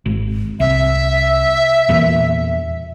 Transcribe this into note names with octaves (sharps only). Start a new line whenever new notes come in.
G#1
C2 E5
E2 A#2